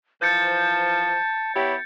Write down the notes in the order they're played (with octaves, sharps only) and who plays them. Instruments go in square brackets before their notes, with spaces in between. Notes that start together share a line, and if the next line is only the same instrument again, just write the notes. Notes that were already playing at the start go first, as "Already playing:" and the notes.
[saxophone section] E3 F3 C5 [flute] A5 [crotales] G6 A6 C#7
[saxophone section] B3 E4 G4 [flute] C#5